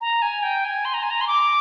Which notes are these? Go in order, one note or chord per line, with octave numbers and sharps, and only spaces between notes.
A#5
G#5
G5
G#5
C6
A#5
G#5
A#5
C6
D6